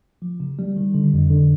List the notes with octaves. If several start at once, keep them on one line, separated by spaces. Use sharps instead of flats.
F3
C#3
G3
D#3
D3
F2
D3